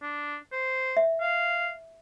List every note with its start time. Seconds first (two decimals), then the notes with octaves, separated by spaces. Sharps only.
0.02 D4
0.52 C5
0.97 E5
1.21 F5